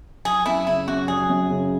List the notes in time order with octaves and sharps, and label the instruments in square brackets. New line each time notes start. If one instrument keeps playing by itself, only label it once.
[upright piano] F#3 [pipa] G#4
[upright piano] F#2 [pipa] E4
[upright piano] C#3 [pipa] E4
[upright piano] F#2 [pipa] F#4
[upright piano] F#3 [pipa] G#4
[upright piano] F#2
C#3